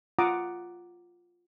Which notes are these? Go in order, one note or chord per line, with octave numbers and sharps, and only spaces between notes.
F4 F#5 A#5 D6 D#6